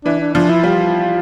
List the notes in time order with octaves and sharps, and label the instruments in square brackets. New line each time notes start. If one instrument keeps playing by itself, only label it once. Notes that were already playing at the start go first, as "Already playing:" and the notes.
[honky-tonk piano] E3 [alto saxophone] D4
[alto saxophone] D4
[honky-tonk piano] F3 [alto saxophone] D4
[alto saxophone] E4
[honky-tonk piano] G3 [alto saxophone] F4